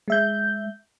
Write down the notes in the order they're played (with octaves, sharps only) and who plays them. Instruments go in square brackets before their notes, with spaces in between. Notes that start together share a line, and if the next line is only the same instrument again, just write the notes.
[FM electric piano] G#3 E5 G6